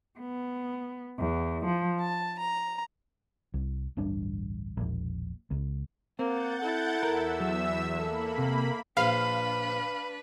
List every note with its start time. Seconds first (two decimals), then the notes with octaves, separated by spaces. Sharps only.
0.18 B3
1.17 E2
1.65 F3
2.00 A5
2.38 A#5
3.54 C2
3.97 D1 A1 G2 D4
4.77 E1 A#1
5.51 C#2
6.19 A#3 C4 F#5 G6 A6
6.62 E4 A4
7.03 E2 A#4 E5 E6
7.40 F#3
7.97 A#3 A4 B5
8.38 C3
8.97 A#1 D4 B4 F5 B5